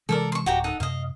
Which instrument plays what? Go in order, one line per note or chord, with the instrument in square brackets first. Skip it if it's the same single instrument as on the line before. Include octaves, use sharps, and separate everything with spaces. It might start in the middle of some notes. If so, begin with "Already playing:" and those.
[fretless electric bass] C3 E3 G#3 [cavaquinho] A4 A#4 D5
[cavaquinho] C6 C#6
[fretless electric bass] D1 [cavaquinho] F#4 G4 A#5
[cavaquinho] D#4 A4 F#5
[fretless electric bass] F#2 C3 [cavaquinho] D#5 F5